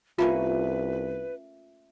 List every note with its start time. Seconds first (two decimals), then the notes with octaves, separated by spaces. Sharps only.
0.18 C2 A3 A#3 C#4 F4 B4